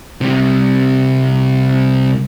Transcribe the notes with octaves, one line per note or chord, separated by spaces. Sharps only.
C3 G3